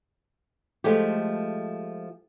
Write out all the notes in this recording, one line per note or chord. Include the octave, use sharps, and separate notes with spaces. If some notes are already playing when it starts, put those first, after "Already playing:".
F3 G#3 A3 G4